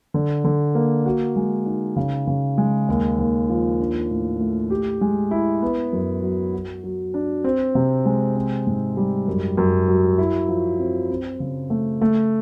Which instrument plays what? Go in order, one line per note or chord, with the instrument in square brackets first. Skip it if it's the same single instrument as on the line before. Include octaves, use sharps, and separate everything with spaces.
[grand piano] D3
D3
A#3
F#4
G#3
D#4
C#3
C#3
G#3
D#2
D#2
F3
D4
A2
A3
G4
G#3
E4
B3
F#2
F#3
F#4
F#3
D4
C4
C3
G#3
C4
G#2
G3
F#2
F#2
F#3
E4
F3
C4
C4
C#3
A3
A3